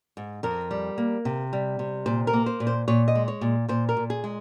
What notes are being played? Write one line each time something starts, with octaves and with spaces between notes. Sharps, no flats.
G#2
F2 A#4
G3
A#3
C3
G3
C3
A#2 C5
A#4
A#3
C5
A#2
C5
A#2 C#5
D#5
G#3
C#5
A#2
A#2 C5
A#4
A#2
G#4
G#3